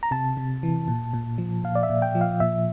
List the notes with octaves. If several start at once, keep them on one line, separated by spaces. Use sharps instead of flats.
A#5
C3 A5
C3
E3
A#2
A#2
F3
A#2 F5
D5
E5
A#2
G5
F3
F5
A#2 E5